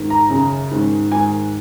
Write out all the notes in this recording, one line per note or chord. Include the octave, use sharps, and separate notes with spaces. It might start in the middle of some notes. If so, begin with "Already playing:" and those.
Already playing: G#2 D#3
A#5
F#2 C#3
G#2 D#3
G#2 D#3 G#5